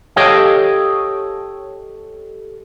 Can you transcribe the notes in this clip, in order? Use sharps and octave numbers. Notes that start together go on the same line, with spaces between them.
G4 A4 C#5 D#5 F5 G5